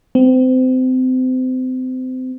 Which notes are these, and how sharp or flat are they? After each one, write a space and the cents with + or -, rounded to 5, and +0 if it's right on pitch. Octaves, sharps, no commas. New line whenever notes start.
C4 -30